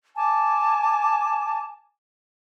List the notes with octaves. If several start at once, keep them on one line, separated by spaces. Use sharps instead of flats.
G#5 A5 D6